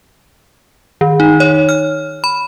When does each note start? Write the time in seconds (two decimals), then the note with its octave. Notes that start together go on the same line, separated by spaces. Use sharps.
1.01 D#3
1.20 D#4
1.40 C#5
1.69 F6
2.24 B5